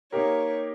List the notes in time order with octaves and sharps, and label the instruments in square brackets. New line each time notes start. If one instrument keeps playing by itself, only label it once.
[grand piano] A#3 D#4 G4 A#4 [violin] C#5